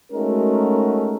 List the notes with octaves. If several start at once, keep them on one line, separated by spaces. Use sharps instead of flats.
G#3 A3 C#4 D#4 F#4 A#4